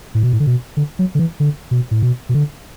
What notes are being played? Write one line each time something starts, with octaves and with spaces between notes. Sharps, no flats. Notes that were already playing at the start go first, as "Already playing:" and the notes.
A2
B2
A2
D3
B2
D3
F#3
D3
E3
D3
B2
A2
B2
B2
D3